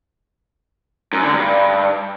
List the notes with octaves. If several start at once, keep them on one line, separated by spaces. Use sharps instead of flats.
F#2
D3
G2